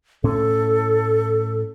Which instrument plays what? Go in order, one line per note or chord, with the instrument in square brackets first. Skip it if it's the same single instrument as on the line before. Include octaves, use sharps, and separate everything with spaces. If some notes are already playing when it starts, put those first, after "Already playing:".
[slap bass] A2 C#4 [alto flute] A4